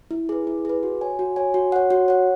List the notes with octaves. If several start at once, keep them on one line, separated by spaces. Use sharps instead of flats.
E4
G#4 B4
E4
G#4 B4
F#4
C#5 G#5
F#4
C#5 G#5
F#4
C#5 F#5
F#4
C#5 F#5